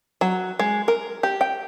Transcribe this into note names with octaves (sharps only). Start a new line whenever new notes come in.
F#3
G#3
A#4
G4
G5